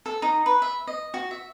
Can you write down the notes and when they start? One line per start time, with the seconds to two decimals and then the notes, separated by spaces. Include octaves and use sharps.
0.06 A4
0.22 D#4
0.46 B4
0.62 E5
0.87 D#5
1.14 F#4
1.31 E5